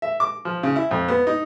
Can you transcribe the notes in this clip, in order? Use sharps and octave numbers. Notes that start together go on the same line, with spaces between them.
E5
D6
F3
C#3
E4
F2
B3
D#4